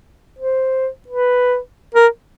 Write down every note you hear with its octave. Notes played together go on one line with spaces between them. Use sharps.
C5
B4
A#4